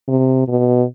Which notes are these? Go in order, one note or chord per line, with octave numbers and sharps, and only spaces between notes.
C3
B2